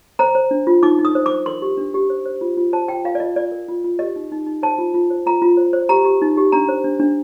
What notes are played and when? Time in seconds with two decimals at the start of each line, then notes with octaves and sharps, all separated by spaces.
0.19 C5 A#5
0.35 C5
0.51 D4
0.67 F4
0.83 D#4 D6
0.99 D#4
1.05 D#6
1.15 C5
1.26 D6
1.31 C5
1.46 A#4 C6
1.62 G4
1.77 D4
1.94 G4
2.10 C5
2.26 C5
2.41 F4
2.57 F4
2.73 C5 A5
2.88 F4 G5
3.04 F4 F5
3.15 D5
3.20 F4 D#5
3.36 F4 D5
3.52 A#4
3.68 F4
3.84 F4
3.99 G4 D#5
4.16 D#4
4.32 D#4
4.46 D#4
4.63 C5 A5
4.78 F4
4.94 F4
5.10 C5
5.26 F4 A#5
5.42 F4
5.57 C5
5.73 C5
5.89 G4 A#5
6.05 G4
6.22 D#4
6.37 G4
6.52 D4 A#5
6.69 C5
6.84 D4
7.00 D4